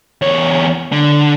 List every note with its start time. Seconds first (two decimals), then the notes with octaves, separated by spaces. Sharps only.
0.22 E2 C#5
0.92 D3